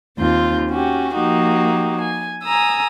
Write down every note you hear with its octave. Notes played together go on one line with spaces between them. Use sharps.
D#2 C4 F4 G6
C#4 F#4 G4
F3 A#3 D#4 F#4 G4
G#5
G#5 A#5 D#6 E6